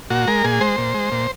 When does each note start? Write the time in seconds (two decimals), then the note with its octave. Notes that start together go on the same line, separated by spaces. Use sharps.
0.10 A#2 F#4
0.27 G#3 A#4
0.44 A#2 G#4
0.61 G#3 C5
0.78 A#2
0.94 G#3
1.12 A#2